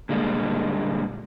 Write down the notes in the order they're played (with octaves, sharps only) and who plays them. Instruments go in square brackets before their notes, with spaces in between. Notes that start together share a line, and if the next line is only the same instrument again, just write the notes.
[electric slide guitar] A#2 D3 G3 G#3 A#3